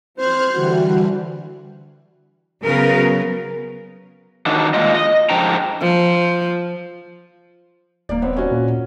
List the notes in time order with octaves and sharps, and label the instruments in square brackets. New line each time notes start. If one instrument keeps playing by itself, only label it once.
[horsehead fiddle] C4 C5 [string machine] F6 F#6 G#6
[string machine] D3 E3 G3 [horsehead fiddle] F#4
[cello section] C#3 A#4 B4 [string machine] F#3 B3
[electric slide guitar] D#3 F#3 D4
G#3 A#3 F4 D#5
D#5
G#2 F3 D4 G5 A#5
[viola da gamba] F3
[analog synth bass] D#1 [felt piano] A#3 D5
[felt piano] B3 C4 C#5
C#4 F#4
[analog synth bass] A#2